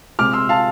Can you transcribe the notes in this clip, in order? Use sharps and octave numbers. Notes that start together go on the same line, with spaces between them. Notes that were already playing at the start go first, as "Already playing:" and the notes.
C3 G#3 D6 F6
C6 E6
F5 A5